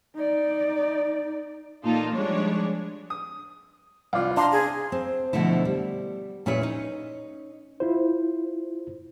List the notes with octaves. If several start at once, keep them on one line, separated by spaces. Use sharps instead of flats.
D#4 D5
A#2 E3 A#3 D#4 F4 A4
F3 G3 G#3 D4 C#5
D#6
C2 F4 D5 F5
D4 F5 A#5 C6
G#4
C4
B2 D3 F3 A3 E4
G3
A#2 C#4 E4 G#4 B4 C#5
C#4 D#4
E4 F4 C5